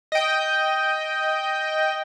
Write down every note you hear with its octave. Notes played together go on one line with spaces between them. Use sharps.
D#5 G5